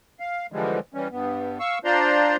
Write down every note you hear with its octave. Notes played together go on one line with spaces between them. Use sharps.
F5
D3 E3 F3 G3 G#3
E3 G3 C#4
G2 B3
F5 C#6 E6
D4 F4 C5 D5 A#5 C6